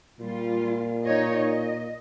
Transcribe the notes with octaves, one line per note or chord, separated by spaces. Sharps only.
A#2 G3 F4
D#4 C#5 D#5
D#5